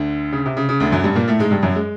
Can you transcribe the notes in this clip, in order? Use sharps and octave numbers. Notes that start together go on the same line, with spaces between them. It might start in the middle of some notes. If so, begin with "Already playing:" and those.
Already playing: D2 D3
C#3
C3
C#3
C#3
D2 D3
F#2 F#3
G2 G3
A#2 A#3
A2 A3
G#2 G#3
G2 G3
F#2 F#3
G#3